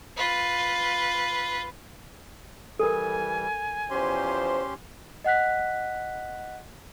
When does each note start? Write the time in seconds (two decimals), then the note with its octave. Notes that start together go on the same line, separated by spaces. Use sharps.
0.17 F4 B4
2.80 E3 G3 A4 A#4 G#5
3.91 E2 F3 C#4 G4 C5 C6
5.25 D#5 F#5 F#6 B6